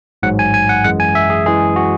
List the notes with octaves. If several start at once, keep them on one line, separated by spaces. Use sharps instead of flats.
A1 G#2 F#3 F#5
G#5
G#5
F#5
F#2 E3 G#3 F#5
G#5
E5
G#4
F#2 E3 G#3 G#4
F#4